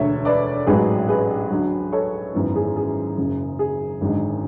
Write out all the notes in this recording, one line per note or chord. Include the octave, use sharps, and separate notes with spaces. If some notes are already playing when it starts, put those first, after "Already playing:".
Already playing: E1 D2 D3 A3 C#5 E5
B4 D5
A1 G#2 F#3 G#4 B4
G#4 B4
D2 D3 F#3
A4 C#5
G#1 F#2 E3 B3
G#4
G#4
F#1 F#2 C#3
G#4
G#1 F#2 D3 G#3